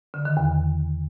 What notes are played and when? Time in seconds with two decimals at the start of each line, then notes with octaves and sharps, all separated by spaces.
0.14 D3
0.25 D#3
0.37 E2